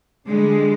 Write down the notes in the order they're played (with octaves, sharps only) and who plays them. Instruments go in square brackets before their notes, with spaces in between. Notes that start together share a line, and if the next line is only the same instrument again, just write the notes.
[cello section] D3 G3 G#3